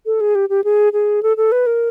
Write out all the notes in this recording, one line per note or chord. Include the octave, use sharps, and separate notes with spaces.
A4
G#4
G4
G4
G#4
G#4
A4
A4
B4
A#4